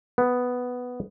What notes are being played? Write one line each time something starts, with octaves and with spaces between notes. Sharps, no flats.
B3